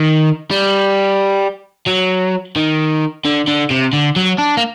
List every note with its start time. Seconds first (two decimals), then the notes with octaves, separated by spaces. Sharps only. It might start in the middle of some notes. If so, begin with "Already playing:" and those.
Already playing: D#3
0.51 G3
1.87 F#3
2.56 D#3
3.25 D3
3.47 D3
3.70 C3
3.93 D3
4.16 F#3
4.38 D4
4.57 A#3